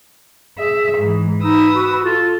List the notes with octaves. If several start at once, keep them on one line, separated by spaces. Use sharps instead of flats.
G#4 E5
G#2 E3
D#4 B4 D#6 E6
F#4
F4 A4